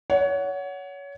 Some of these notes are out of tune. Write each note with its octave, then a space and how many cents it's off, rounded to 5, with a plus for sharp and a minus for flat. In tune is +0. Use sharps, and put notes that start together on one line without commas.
C#5 +25 F#5 +0